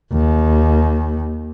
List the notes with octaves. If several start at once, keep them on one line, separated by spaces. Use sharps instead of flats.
D#2